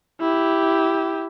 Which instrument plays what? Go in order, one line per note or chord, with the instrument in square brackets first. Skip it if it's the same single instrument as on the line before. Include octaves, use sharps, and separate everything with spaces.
[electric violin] E4 G4